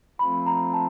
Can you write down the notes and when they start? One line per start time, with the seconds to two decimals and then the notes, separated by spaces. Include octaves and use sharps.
0.19 F3 A3 C4 F4 B5
0.47 A#5
0.73 A5